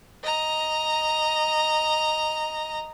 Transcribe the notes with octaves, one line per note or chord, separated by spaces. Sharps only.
D#5 A#5